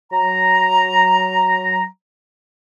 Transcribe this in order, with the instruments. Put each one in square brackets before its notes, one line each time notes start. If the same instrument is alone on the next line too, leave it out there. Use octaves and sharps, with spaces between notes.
[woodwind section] F#3 A#5